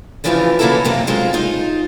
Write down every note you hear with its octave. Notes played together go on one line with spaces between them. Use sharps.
C#3 E3 F3 A3 F4 G4
C#3 E3 A#3 E4 F#4 A4
F#2 C3 A#3 C4
F#3 G#3 F4 C5
D#4 F4